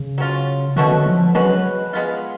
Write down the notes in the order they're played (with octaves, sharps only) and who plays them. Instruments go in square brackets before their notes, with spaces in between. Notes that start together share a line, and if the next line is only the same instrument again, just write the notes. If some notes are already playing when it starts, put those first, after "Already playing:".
Already playing: [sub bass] C#3
[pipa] F#3 C#4 F4
[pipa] B2 A3 C#4 F#4 [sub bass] D3
[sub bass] D3
F3
[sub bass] F#3 [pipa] G#3 C#4 F#4 B4
[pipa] G#3 B3 F4